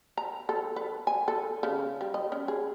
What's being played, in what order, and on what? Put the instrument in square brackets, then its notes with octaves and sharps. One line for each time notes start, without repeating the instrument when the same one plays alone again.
[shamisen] A#5
A4
B4
G#5
A4
C#3
G3
D#5
C#4
G#4